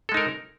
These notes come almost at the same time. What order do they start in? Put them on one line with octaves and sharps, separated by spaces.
A4 G#3 D#4 A#4